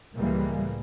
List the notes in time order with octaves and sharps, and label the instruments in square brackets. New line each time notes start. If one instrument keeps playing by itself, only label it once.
[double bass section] C#2 A2 E3 G3 G#3 A#3